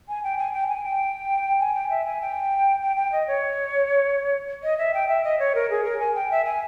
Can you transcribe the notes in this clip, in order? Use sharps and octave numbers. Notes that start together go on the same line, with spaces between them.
G#5
G5
G#5
G5
G#5
G5
G#5
G5
E5
G#5
G5
G5
G5
D#5
C#5
D#5
E5
G5
E5
D#5
C#5
A#4
G#4
A#4
G#5
G5
E5
G#5